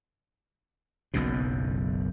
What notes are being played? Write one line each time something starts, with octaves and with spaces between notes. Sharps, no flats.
F#1 B1 F#2 B2